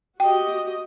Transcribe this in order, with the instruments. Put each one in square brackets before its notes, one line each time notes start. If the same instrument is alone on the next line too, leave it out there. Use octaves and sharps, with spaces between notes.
[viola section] F#4 G4 D#5 [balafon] G5